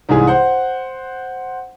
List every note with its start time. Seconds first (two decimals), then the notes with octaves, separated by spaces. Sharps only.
0.09 C2 G#2 E3 G#4
0.27 C5 F#5